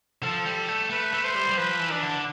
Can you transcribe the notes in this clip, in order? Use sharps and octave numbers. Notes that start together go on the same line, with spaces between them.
F3 A4
G3
A4
A3
A3 B4
A3
C5
G3
G3
F3 B4
E3
D4
D3